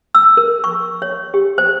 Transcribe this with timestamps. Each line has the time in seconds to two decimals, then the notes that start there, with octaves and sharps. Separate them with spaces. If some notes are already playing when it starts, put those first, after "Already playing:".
0.15 E6
0.37 A#4
0.64 C#6
1.02 C#5
1.34 G4
1.58 C5